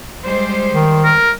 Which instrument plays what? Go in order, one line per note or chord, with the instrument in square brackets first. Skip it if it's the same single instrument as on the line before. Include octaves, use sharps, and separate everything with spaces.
[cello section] G3 G#3 C5
[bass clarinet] D#3
[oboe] A#4